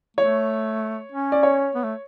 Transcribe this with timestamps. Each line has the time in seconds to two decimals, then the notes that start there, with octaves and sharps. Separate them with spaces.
0.17 A3 C#5
1.12 C#4
1.32 D5
1.43 C#5
1.75 B3
1.84 A3